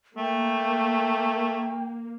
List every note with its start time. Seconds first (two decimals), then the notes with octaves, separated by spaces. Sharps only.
0.17 A3 A#3 G5